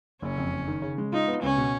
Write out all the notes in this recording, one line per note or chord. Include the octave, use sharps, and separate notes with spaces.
F#1 C#4
F2
F#1
D#3
C#3
G#3
D#4 F4
B3
C#2 C#4
B2